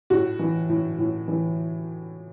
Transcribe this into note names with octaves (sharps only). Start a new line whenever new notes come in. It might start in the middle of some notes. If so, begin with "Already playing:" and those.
A2 F#4
E3
A2
A2
E3